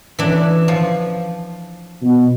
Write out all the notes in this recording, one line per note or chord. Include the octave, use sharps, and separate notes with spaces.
E3 D4
F3
B2